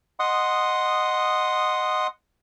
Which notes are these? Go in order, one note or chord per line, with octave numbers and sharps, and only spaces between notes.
D#5 F#5 C6 D#6